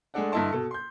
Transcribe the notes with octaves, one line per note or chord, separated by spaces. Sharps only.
G#3 A3 D4 A4 D5 F#5
G2 D3 E4 D#5 A5 C6
B2 A4
C6 G6